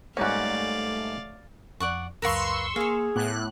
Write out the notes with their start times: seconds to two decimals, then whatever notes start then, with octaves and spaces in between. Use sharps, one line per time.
0.17 G#2 G3 A3 A#3 C#4 F#4 D5 F5
1.80 F2 D5 F#5 C#6
2.22 C#2 F#2 A#4 B4 F5 C6 C#6 E6
2.76 A#3 G#4 F5 G#5
3.16 A2 B3 F#5 D6 F#6